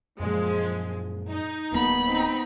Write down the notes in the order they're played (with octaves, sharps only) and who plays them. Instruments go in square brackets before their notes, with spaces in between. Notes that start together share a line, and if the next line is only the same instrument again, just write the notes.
[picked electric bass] F#2 A#2 [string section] F3 G#3
[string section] D#4
[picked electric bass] D1 A#3 [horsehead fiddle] B3 B5
[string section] C4 D#4